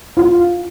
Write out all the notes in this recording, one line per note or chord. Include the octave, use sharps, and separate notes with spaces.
F4